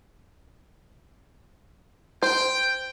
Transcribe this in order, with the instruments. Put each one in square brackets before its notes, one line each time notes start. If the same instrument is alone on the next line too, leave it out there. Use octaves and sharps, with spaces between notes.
[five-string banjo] C5 [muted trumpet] G5